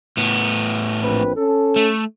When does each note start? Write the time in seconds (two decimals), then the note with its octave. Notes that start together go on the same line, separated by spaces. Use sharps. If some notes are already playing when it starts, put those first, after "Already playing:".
0.17 A2 B3
1.01 A#1 C4 B4
1.36 C#4 A4
1.76 A3